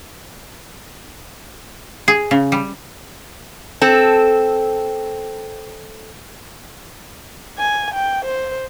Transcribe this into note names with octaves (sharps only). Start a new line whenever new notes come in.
G#4
C#3
G3
C4 A4
G#5
G5
C5